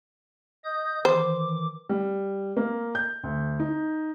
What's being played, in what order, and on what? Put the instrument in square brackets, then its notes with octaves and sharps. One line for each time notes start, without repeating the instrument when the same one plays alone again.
[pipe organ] D#5 D#6 G6
[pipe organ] D#3 E3 D6 [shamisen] C5
[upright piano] G3
A#3
G6
D2
D#4